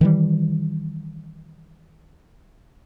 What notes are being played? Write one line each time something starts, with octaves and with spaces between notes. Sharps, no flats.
D#3 E3 G3